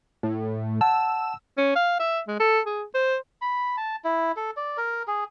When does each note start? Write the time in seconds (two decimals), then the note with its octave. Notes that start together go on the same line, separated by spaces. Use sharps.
0.23 A2
0.81 F#5 A5 E6
1.57 C#4
1.76 F5
2.00 E5
2.28 G#3
2.40 A4
2.66 G#4
2.95 C5
3.42 B5
3.77 A5
4.05 E4
4.37 A4
4.57 D5
4.77 A#4
5.08 G#4